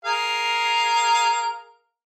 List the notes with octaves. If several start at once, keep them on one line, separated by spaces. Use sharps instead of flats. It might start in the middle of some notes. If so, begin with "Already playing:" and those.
G#4 A#4 F5